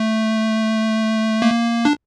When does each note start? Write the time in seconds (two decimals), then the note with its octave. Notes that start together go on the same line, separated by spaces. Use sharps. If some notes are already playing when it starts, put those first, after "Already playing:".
Already playing: A3
1.42 A#3
1.85 D4